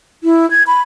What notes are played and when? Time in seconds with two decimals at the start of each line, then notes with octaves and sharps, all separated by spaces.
0.24 E4
0.51 G#6
0.67 B5